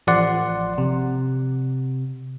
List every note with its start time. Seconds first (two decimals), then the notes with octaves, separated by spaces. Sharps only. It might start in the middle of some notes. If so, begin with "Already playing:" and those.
0.07 A1 F3 D5 F#5 C6
0.78 C3